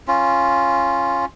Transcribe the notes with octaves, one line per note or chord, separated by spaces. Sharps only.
C#4 F4